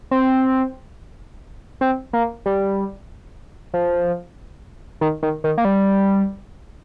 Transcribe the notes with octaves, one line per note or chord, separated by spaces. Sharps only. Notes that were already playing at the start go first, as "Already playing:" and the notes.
C4
C4
A#3
G3
F3
D#3
D#3
D#3
A#3
G3